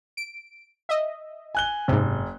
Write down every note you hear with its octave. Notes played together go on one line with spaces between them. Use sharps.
D7
D#5 E5
G#5 F#6 G7
F#1 G#2 C3